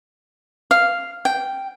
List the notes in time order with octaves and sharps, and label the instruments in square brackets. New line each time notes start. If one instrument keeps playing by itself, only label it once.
[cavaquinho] F5
G5